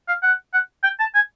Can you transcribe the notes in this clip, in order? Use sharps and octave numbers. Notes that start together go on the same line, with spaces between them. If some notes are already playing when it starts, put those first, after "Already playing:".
F5
F#5
F#5
G5
A5
G#5